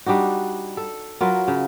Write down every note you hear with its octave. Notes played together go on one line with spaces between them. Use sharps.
G3 D4 D#4 F#4
A4
F#3 F4 A#4 B4
C#3